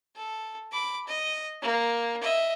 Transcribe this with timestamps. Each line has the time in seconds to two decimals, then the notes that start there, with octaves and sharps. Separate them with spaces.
0.16 A4
0.72 B5 D6
1.07 D#5
1.62 A#3
2.22 D#5 E5